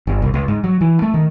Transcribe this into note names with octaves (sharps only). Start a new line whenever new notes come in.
G1
C2
C#2
G#2
F#3
E3
A3
D#3